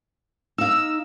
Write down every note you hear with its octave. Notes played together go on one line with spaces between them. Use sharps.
D#4 F5 E6